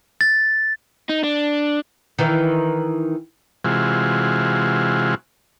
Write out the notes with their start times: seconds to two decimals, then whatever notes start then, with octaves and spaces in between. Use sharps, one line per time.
0.21 A6
1.09 D#4
1.23 D4
2.19 D#3 E3
3.65 C3 E3 G#3 F4 F#4